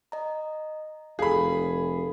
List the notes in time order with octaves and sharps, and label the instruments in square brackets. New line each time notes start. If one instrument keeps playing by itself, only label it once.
[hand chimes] D#5 A#5
[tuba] F1 [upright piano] G#4 B5 [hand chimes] A4 F5